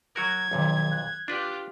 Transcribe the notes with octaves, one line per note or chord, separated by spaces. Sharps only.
F#3 F#4 A#4 G#6
B1 F2 A#2 D#3 F#3
F#6
D4 F4 G4 B4 D5